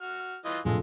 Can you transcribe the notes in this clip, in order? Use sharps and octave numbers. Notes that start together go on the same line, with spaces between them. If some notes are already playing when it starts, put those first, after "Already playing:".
F#4 F6
E3 F4 D#5
A#1 F#2 A2 C3 G#3 F4 A4